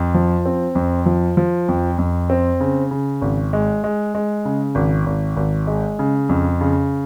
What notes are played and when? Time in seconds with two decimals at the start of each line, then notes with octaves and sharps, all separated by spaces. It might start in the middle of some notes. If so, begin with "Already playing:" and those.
Already playing: F2
0.14 F3
0.46 C4
0.75 F2
1.06 F3
1.37 F3
1.69 F2
1.98 F2
2.30 C4
2.60 C#3
2.91 C#3
3.22 G#1
3.53 G#3
3.84 G#3
4.15 G#3
4.45 C#3
4.75 G#1
5.06 G#1
5.37 G#1
5.67 G#3
5.99 C#3
6.29 F2
6.61 C#3